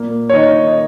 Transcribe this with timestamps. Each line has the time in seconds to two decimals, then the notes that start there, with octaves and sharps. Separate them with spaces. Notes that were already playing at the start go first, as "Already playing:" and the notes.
Already playing: A#2 A#3
0.30 C#5
0.33 D#3 D#4 D#5
0.67 D#5